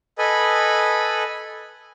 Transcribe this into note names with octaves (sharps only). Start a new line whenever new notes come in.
A4 B4 D#5 G#5 B5